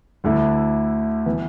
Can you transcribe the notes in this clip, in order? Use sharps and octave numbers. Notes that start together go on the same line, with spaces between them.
D2 D3 A3 E4
E3 B3